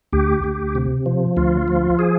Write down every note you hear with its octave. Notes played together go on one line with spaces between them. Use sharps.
D2 G4
D2
C3
F3
D2 F4
F3
G#4